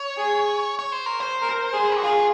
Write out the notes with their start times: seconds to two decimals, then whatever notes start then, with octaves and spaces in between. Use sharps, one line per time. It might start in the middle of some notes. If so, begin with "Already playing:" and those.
Already playing: C#5
0.17 G#4
0.79 C#5
0.92 C5
1.06 A#4
1.20 C5
1.42 A#4
1.73 G#4
1.97 F#4
2.03 F4 G#4